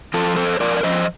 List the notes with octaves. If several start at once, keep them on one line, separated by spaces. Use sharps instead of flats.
F3 F4 A4
F2 A4 C5
F2 A#4 D5
D5
F3 C5 D#5